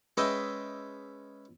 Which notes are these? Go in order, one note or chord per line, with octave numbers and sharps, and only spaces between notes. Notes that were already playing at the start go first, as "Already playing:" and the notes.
G#3 C#4 B4 D#5 E5 G5